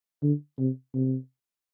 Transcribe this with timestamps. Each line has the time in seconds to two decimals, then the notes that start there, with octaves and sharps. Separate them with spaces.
0.23 D3
0.59 C3
0.94 C3